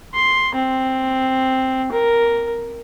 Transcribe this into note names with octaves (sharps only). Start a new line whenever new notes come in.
C6
C4
A#4